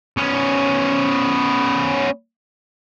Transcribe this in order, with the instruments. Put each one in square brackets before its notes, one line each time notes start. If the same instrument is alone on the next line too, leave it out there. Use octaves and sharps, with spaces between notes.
[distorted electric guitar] B3 C#4